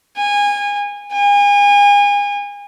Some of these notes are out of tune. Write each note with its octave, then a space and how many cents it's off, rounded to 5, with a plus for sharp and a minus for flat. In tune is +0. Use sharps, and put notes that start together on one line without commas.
G#5 -25
G#5 -35